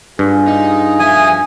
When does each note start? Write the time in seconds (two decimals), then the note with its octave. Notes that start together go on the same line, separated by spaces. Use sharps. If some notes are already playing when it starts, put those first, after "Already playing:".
0.19 G2 F4 G#4
0.47 D#4
1.00 F2 E5 G#5 D#6